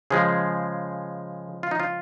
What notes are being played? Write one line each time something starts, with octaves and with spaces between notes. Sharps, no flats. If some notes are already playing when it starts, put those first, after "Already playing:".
C#3 F3 G#3 G#4
F4
D#4
F4